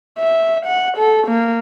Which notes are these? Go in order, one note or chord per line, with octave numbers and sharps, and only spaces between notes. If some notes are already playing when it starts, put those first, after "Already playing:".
E5
F#5
A4
A#3